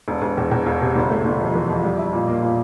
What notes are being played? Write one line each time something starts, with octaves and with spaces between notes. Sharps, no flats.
E1
E1
E2
E2
E1
C3
G1
A3
G1
F2
E3
F2
G3
E4
A#2
A#3
A#2